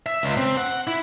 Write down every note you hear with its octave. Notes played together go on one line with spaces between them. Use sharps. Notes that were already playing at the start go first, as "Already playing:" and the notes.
E5
C#2
C4
F#5
E4